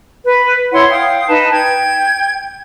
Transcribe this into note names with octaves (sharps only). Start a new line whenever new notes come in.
B4
E4 C#5 F#5 C6
F5 G5 D#6
D#4 B4 A5
G5 G#6